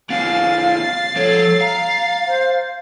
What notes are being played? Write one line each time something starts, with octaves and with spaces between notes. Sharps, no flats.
D#3 B3 F5 A6 C7
F3 A4 C#5
F5 A#5
C5